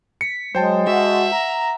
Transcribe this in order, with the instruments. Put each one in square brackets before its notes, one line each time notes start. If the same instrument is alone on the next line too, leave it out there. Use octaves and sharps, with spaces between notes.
[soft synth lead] B6 [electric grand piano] C#7
[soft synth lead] F#3 [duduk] G#3 [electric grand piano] C5 G5 A5
[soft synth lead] F#4 [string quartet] E5 F#5
[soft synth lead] A#5